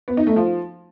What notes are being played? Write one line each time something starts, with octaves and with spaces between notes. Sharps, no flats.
B3
D#4
A3
F3